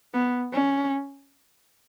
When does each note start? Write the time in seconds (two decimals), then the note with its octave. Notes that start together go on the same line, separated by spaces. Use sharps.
0.14 B3
0.53 C#4